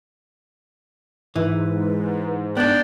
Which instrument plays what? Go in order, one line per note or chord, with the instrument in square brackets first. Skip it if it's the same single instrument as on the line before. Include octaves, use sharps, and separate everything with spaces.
[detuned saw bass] G#2 [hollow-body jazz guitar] E3 [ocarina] B4
[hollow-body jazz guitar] B3 D4 [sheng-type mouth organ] D5 G5